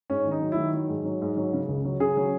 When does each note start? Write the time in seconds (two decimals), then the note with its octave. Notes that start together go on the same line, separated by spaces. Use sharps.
0.10 G#2 C#4
0.25 D#3
0.31 D#4
0.41 F#3
0.52 E4
0.57 D#3
0.73 F#3
0.89 G#2
1.05 F#3
1.21 G#2
1.37 F#3
1.53 C#3
1.69 C#2
1.85 F#3
2.00 C#3 G#4
2.17 F#3